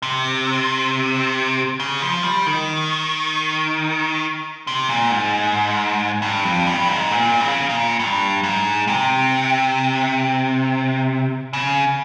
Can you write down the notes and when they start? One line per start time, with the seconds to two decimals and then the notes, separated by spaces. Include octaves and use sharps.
0.02 C3
1.80 C#3
2.02 F3
2.24 G3
2.46 D#3
4.67 C3
4.89 A#2
5.11 G#2
6.22 G2
6.44 F2
6.67 G2
6.89 G#2
7.11 A#2
7.41 C#3
7.69 A#2
7.99 G2
8.43 G#2
8.88 C3
11.53 C#3